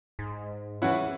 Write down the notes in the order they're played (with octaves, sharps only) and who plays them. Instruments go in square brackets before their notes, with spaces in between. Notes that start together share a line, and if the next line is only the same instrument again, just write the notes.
[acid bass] G#2
[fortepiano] E3 E4 [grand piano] C#4 F#5